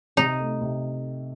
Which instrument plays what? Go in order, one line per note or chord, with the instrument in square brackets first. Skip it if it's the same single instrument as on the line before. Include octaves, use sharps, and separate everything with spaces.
[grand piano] C3 [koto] D#4
[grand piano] A3
C3